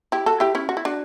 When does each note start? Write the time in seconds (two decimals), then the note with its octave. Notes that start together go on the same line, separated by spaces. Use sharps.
0.12 E4 G4
0.26 F#4 A4
0.40 E4 G4
0.55 C#4 E4
0.69 F#4
0.77 E4
0.85 D4 F#4